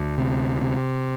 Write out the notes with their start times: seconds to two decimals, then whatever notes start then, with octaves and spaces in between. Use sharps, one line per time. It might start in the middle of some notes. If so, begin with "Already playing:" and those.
Already playing: D2
0.18 C3
0.61 C3